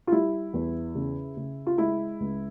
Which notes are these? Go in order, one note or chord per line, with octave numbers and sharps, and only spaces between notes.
F4
G3 E4
E2
C#3
C#3
F4
G#3 E4
C#2